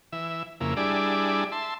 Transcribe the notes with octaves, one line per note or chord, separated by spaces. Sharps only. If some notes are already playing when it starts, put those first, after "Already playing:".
E3 E5
F2 C#3 A#3 E4
G3 D4 E4 G#4 D5
E5 A5 C6